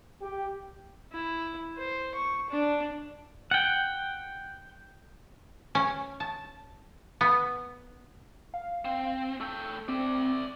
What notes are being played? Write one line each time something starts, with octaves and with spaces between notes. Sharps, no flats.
G4
E4
C5
C#6
D4
F#5 G5
C#4
A5
B3
F5
C4
A3 G5 E6
C4 D5 E5